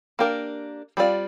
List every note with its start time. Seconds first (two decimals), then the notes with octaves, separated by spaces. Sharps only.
0.19 A#3 D4 G4 A#4
0.97 G3 C4 F4 D5